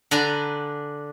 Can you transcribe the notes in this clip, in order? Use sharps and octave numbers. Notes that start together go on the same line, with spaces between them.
D3 D4 B4 G#5 A#5